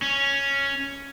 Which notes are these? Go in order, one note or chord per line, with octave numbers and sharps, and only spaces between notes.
C#4